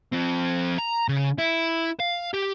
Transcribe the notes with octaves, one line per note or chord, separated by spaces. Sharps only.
F3 C4
A#5
C#3
E4
F5
G4